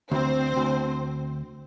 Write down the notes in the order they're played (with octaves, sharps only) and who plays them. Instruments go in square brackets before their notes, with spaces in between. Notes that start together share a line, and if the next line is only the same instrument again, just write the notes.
[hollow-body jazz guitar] D2 [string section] C4 C5
[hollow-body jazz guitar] D2